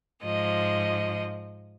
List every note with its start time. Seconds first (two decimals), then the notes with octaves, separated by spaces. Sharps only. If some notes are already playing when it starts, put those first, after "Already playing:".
0.22 G#2 F3 D#5